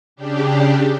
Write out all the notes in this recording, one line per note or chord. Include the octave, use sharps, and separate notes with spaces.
C#3 D4 G4